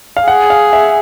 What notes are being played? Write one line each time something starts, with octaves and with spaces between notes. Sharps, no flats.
F5
G#4 F#5
F5
E5